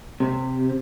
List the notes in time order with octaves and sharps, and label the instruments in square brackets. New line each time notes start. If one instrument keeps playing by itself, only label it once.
[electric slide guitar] C3